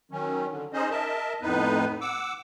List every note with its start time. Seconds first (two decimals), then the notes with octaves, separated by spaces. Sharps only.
0.11 D#3 F#3 C#4
0.50 D3
0.73 C#4 D#4 G#4 C5 D#5
0.90 A#4 D#5 E5 A5
1.42 F2 A2 B3 D#4 B4
2.01 F#5 D6 E6